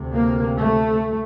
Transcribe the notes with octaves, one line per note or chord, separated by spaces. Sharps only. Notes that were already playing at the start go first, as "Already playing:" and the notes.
Already playing: D2 C3
A#3
A3